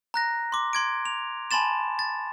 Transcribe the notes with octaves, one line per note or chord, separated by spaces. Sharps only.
A#5 F#6 A#6
C6 D6
C6 G#6 D7
F7
G#5 A5 B5 C6 A6 E7
A6